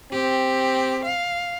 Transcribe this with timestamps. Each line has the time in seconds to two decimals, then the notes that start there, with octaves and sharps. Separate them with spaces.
0.12 C4 G4
1.05 F5